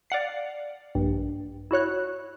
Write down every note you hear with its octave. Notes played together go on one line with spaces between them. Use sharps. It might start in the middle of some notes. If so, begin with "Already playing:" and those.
D5 F5 F#5 C7
A#1 G2
E4 F#4 C#5 F#6